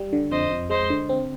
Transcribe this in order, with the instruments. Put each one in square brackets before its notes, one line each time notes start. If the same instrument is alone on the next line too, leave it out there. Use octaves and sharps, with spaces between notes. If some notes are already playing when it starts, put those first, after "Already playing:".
Already playing: [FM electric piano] G3
D3
[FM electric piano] F2 [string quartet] C5 D#5
[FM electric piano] F2
[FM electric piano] G#3 [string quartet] C5 D#5
[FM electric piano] D3
C4